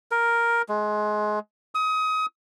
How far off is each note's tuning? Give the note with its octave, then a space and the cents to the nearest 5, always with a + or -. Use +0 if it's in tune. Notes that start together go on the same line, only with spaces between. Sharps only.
A#4 +5
G#3 +25
D#6 +25